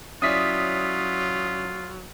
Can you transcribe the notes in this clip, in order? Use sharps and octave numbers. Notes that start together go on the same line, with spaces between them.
F#3 C#4 E4 F4 D5 D#6 B6